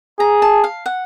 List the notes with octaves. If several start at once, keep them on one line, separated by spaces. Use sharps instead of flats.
G#4 A#5
A5
F5
F#5